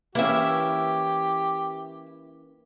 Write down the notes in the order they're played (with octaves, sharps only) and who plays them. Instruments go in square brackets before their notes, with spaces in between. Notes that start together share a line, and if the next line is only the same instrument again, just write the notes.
[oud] E3 [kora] A#3 C#4 [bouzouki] E4 E5 [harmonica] G4